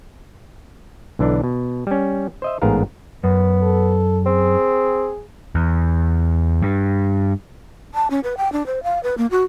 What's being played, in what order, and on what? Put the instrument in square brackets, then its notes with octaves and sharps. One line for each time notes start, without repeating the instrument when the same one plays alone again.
[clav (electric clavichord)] B1 D3 E3 D4
B2
G3 C#4
C5 D#5 E5
A1 G#2 B3 G#4 A#4 F5
[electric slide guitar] F#2 [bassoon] B3
[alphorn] A4
[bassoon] C4 [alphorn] G#4
[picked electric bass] E2
G2
[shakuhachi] A5
C#4
B4
G5
D4
C5
F5
B4
A#3
F#4